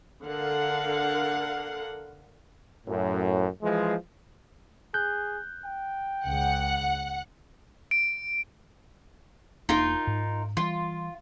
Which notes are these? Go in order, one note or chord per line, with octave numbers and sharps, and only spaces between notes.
D3 A#4 F5 F#5
F#2 A2
E3 F3 G#3
G#4 F#6 G6
G5
C#2 C#3 F#5
D7
E1 A#3 D4 D#4 F4 A#4
G#2
E3 G3 F4